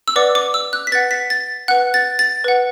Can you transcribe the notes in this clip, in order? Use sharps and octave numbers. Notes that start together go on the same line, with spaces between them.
E6
B4 D5 F#5 D6
D6
E6
F#6
B6
B4 F#5 A6
B6
A6
B4 F#5 F#6
A6
A6
B4 F#5